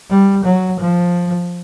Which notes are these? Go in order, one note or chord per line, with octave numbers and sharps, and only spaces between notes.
G3
F#3
F3